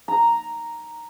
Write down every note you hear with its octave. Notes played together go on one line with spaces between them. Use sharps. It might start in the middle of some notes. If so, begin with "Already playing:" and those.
A#5